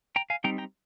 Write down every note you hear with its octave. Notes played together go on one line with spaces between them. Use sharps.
G5 A#5
F5 G#5
G3 C4 D#4 G5 A#5
G5 A#5